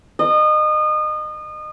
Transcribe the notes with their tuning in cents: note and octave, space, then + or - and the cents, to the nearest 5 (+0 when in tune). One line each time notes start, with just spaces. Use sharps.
D#5 -30